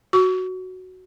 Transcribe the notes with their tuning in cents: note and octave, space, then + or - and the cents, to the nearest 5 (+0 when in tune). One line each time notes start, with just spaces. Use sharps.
F#4 +0 C#6 +35